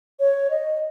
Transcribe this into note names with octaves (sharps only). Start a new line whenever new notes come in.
C#5
D#5